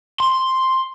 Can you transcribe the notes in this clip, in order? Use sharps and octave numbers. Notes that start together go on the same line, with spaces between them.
C6